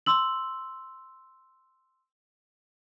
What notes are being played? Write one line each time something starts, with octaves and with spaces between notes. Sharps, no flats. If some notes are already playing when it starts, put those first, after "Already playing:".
C6 E6 F#7